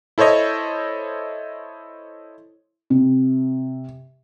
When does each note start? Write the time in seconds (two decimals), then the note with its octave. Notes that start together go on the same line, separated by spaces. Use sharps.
0.18 E4 A4 C5 C#5 D#5
2.90 C3